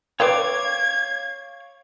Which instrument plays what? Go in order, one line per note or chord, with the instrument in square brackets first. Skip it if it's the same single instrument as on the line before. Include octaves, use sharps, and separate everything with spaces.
[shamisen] B4 D5 G5 [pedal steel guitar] C#5 F5 D6 [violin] G#6